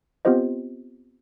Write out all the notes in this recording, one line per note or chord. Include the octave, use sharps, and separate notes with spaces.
B3 C4 F4 G4 C5 D#5